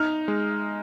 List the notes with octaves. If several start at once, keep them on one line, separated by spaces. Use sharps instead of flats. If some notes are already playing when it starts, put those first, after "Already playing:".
Already playing: D#4 F6
G#3